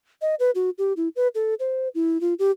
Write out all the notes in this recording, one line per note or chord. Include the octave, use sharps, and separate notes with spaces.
D#5
B4
F#4
G4
E4
B4
A4
C5
E4
F4
G4